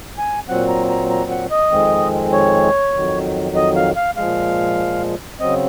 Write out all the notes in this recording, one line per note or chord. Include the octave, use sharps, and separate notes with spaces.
G#5
A#2 F#3 C4 F#5
A#5
A#5
A#5
F#5
D#5
F2 D#3 G#3 C4
C#5
F2 D#3 F#3
D#5
F5
F5
A#2 F3 G#3 F5
C#3 F#3 C4 D#5